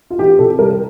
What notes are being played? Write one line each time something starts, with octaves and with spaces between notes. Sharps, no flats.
F4
E3 G4
C3 A4
G3 A#4